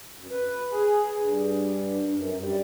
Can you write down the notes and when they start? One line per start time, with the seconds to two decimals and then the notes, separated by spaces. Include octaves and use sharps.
0.18 F#2
0.31 B4
0.70 G#4
1.19 G2
2.11 F#2
2.37 G3